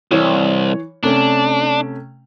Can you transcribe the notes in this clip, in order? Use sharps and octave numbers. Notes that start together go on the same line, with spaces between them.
C2 E3 C#5
C3 A3 C#4 D4